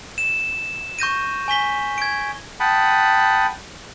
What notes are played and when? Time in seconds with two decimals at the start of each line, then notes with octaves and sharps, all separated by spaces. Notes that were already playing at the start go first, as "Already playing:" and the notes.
0.18 E7
0.99 C#6 G6 A#6 D#7
1.48 G#5 C#6 B6 G7
1.98 G#6 D7
2.60 F#5 G5 A5 B5 D#6